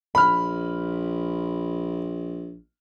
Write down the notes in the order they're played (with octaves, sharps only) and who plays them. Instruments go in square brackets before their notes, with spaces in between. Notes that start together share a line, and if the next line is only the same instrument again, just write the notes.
[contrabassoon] A#1 [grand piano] B5 F6